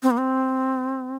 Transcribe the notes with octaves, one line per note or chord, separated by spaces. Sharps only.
C4
A#3
C4